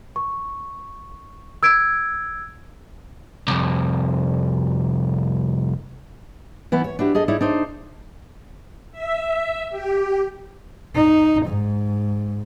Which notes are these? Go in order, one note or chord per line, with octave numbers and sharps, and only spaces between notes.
C#6
E6 G#6 D7
C2 F2
E3 B3 E4
C#5
D4 E4 F#4 G4
G#4 A4 D#5
D#4 E4 C#5 D5
D4 D#4 C5
E5
G4
D#4
G#2